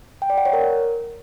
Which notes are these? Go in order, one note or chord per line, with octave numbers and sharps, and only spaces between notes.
G5
D5
F#5
C#5
A#4